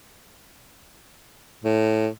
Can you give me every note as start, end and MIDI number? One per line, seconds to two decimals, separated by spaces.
1.64 2.08 45